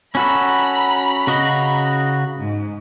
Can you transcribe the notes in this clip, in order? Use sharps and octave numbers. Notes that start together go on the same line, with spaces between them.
C#4 F#4 A4 A#5 B5
C#3 F#4 D#5
G#2